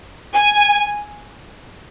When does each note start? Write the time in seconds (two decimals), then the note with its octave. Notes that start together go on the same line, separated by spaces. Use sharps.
0.35 G#5